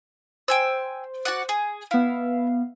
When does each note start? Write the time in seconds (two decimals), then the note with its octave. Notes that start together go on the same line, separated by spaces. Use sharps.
0.48 C5 G5 G#5 E6
1.25 F#4 D5 F#5
1.49 G#4
1.91 B3 E4 F5